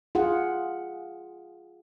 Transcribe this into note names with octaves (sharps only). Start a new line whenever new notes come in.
F4 G#4 F#5